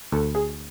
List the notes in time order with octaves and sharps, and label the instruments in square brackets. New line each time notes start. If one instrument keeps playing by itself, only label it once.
[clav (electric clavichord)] D2 [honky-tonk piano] A4
[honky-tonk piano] G#4